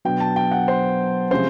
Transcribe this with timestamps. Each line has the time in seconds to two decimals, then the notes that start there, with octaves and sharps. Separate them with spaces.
0.05 B2 F#3 B3 D4 G5
0.20 A5
0.36 G5
0.51 F#5
0.68 C5
1.31 C3 F3 G#3 C#4 C5